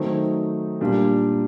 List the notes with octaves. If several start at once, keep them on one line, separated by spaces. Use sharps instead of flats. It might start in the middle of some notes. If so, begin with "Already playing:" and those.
Already playing: D#3 F#3 A3 C4 D#4
A#2 G3 A#3 D4